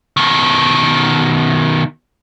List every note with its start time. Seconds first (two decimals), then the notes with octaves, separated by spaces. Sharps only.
0.17 B2 D#3